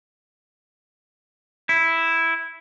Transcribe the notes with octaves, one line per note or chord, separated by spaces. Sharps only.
E4